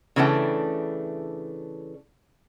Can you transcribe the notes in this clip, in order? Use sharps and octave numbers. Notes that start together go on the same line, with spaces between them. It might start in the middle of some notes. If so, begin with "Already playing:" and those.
C#3 E3 A3 D4 G5